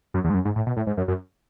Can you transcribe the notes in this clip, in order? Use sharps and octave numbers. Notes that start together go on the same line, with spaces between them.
F#2
E2
G#2
F#2
G#2
A2
B2
A2
G#2
F#2
F#2